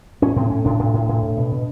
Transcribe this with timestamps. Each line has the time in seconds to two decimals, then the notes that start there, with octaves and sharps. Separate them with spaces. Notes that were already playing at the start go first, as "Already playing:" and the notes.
0.22 A2 C#4
0.36 A2 C4
0.50 A2 C#4
0.65 A2 D4
0.79 A2
0.94 A2
1.09 A2
1.22 A2
1.37 B2
1.52 B2